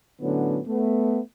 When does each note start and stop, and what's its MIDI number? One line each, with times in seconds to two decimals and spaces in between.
0.21 0.60 45
0.21 0.60 50
0.21 0.60 54
0.21 0.60 59
0.21 0.60 61
0.67 1.19 57
0.67 1.19 59